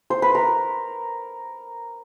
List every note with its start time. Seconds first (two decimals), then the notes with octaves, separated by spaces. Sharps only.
0.10 C5
0.22 B4
0.35 A#4